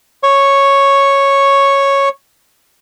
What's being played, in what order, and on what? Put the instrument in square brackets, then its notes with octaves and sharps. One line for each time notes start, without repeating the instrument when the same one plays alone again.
[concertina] C#5 C#6